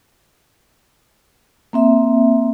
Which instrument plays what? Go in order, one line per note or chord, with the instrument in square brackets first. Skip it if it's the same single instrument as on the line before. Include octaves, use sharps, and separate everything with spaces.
[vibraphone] A#3 C4 E5